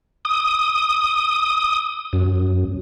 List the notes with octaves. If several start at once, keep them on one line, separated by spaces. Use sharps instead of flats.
D#6
F#2